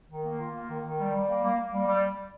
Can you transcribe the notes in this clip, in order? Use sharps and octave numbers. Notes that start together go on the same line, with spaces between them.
D#3
A#3
F4
A#3
D#3
D#3
G3
G3
A#3
A#3
A#3
G3
G3